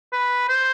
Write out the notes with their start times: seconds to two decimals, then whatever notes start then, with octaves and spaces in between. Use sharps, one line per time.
0.12 B4
0.49 C5